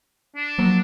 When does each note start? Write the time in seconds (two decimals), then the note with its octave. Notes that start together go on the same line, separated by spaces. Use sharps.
0.36 D4
0.58 F3 F#3 A#3